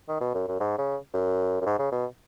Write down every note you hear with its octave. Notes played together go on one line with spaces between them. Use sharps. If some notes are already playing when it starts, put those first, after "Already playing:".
D#3
B2
F#2
F#2
G#2
C#3
F#2
F#2
G#2
C#3
B2